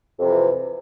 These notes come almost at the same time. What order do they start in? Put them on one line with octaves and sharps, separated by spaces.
F2 C3 E3